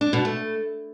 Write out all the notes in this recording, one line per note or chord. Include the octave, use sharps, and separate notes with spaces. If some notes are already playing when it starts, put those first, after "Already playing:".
D4
B2
A3